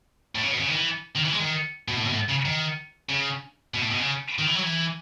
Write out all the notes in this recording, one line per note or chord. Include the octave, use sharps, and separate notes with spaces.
A2
C#3
B2
C#3
D#3
E3
D#3
E3
G#3
D#3
B2
A2
B2
A2
C#3
D#3
C#3
B2
A2
B2
C#3
D#3
E3
F#3
E3